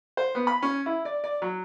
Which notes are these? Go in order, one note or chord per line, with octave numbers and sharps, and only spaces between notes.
C5
B3
B5
C#4
E4
D5
D5
F#3